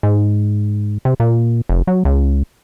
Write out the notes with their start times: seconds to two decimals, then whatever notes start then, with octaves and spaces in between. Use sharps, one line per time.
0.03 G#2
1.05 C3
1.20 A#2
1.69 F1
1.87 F#3
2.05 C#2